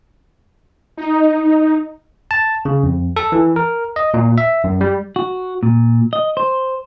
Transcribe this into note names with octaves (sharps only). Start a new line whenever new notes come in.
D#4
A5
C#3
F2
A4
E3
A#4
D#5
A#2
E5
F#2
G3
F#4
A#2
D#5
C5